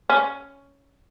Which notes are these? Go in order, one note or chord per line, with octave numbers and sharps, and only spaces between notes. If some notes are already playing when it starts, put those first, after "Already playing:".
C#4